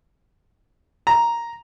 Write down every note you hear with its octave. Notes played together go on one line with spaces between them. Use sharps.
A#5